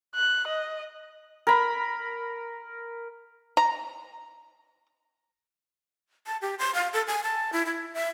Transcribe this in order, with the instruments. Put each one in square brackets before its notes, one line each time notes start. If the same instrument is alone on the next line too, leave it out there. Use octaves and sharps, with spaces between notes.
[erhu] F#6
D#5
[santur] A#4 B5
[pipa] A#5
[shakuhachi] A5
G4
C6
F5
A4
G#5
A5
E4
E4
E5